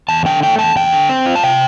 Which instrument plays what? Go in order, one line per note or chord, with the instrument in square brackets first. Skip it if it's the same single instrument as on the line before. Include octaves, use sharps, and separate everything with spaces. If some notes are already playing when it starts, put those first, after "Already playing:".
[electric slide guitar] E2 A5
D3 G5
A3 G5
E2 A5
E2 G5
D3
C4
F4
A5
C3 G5